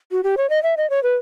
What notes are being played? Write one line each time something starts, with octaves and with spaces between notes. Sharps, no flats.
F#4
G4
C#5
D#5
E5
D#5
C#5
B4